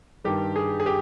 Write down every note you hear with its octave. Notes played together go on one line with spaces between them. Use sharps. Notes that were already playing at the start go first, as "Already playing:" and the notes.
G2 D#3 G3 G4
G#4
G#4
G4